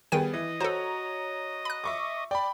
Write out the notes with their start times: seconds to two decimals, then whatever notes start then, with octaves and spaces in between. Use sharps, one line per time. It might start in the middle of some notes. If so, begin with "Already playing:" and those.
0.12 D#3 G3 B3 G#4 G5 D#7
0.33 E3 D#5
0.60 F#4 A4 C5 C#5 A#5
1.65 B5 F#6
1.84 E5 C#6 D6
2.31 D5 G5 B5